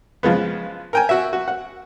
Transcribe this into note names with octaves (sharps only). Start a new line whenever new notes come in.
C#3 F3 G#3 B3
A#4 G5 G#5
F#4 E5
F#4
F#5